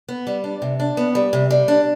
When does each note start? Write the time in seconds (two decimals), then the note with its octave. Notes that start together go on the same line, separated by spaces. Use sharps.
0.09 B3
0.27 G3
0.44 D4
0.62 C3
0.80 D4
0.97 B3
1.15 G3
1.33 C3
1.51 G3
1.68 D4